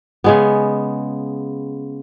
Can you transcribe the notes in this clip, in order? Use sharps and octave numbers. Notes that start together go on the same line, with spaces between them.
C#3 G#3 B3